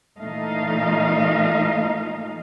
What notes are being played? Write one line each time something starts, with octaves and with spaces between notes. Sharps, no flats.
A#2 E3 A3 D#4 D#5 F5